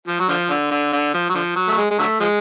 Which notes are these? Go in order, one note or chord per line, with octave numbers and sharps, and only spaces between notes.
F3
F#3
D3 F3
D3
D3
D3
F3
F#3
D3 F3
F#3
A3
G#3
G#3
D3 F#3 A3
F3 G#3